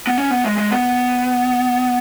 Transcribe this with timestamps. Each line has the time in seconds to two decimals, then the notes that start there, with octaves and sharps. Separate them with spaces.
0.07 B3
0.18 C#4
0.30 B3
0.44 G#3
0.58 G#3
0.71 B3